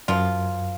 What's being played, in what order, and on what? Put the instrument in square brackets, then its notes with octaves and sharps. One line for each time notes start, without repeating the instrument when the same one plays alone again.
[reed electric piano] F#2 [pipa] F3 F4